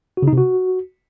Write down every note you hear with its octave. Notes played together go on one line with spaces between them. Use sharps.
F#4
C#3
D#4
C3
F#4